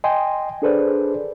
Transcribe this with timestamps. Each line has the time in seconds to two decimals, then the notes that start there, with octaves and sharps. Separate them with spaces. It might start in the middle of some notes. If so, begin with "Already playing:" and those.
0.04 D#5 G5 G#5 C6
0.62 D4 G#4 A4 B4 C5 D5